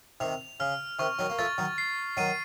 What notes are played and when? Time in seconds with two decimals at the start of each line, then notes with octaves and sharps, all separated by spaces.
0.20 C3 D#3 F7
0.60 C#3 F6
0.99 C3 D#3 C#6
1.19 D#3 F#3
1.30 A#3
1.38 F3 A3 A6
1.58 D#3 F#3
1.78 C7
2.17 D#3 F#3 D#7